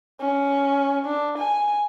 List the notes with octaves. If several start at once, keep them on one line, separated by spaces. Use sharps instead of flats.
C#4
D4
G#5